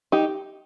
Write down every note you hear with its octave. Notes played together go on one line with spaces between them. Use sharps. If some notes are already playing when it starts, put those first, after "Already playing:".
D#4 G4